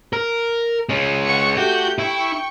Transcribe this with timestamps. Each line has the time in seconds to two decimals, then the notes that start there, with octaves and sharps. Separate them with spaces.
0.13 A#4
0.89 G#3 C#4
1.23 F#5 C#6 C#7
1.57 A3 F#4 G4 G6
1.99 E4 G5 C#6